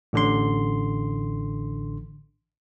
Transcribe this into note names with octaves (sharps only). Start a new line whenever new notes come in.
A1 D3 C6